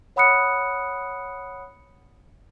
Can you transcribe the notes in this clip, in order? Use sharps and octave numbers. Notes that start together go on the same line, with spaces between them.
C#5 F#5 B5 D#6 F#6 C#7